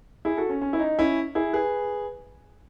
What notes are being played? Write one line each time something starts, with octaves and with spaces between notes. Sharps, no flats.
E4 G#4
F#4 A4
C#4
C#4
E4
D#4
C#4 E4
E4 G#4
G#4 B4